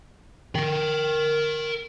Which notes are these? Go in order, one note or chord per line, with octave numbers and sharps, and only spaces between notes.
A#4 G5